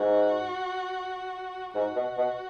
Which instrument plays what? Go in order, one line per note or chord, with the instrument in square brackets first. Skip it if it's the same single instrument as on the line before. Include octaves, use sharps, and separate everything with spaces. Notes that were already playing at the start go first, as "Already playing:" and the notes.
Already playing: [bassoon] G#2 [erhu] F#4
[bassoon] G#2 [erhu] F#4
[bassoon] B2
B2